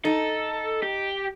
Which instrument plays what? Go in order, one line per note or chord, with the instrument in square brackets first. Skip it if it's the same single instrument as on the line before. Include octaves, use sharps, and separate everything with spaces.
[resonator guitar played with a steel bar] D#4 [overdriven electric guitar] A4
[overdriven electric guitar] G4